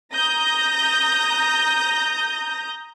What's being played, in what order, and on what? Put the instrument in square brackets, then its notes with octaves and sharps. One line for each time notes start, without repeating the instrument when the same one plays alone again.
[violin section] A#5 D#6 G6 A#6